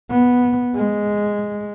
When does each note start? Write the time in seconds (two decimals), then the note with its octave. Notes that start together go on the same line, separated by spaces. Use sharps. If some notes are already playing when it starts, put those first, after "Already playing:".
0.10 B3
0.75 G#3